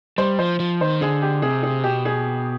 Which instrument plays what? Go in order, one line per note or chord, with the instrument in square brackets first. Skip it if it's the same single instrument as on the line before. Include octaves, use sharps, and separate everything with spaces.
[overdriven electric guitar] G3 [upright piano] C5
[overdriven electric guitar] F3 [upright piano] C5
[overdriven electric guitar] F3
[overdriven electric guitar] D#3 [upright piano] C5
[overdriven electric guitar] D3 [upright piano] G#4
[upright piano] G4
[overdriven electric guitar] C3 [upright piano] G#4
[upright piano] G#4
[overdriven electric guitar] B2 [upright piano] G4
[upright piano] G#4